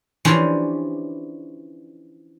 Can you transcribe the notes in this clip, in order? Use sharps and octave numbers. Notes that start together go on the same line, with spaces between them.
E3 F3 C#4 D4 G4